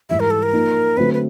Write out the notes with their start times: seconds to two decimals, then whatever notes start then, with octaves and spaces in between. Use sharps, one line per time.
0.09 G#2 E3 G3 E5
0.20 A#4
0.31 A4
0.43 A#4
0.53 F3 A#3 D#4
0.97 D3 F#3 A3 C4 B4
1.14 B4